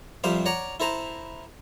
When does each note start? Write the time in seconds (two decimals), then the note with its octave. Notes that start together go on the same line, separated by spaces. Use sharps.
0.24 F2 C3 G3 C5 F5
0.46 C#5 D5 F#5 A#5
0.80 E4 A4 C5 A#5